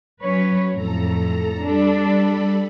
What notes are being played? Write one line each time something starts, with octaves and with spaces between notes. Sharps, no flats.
F#3 C#4 B4 C#5
F2 A2 A4 A#5
G3 D4 A4 B5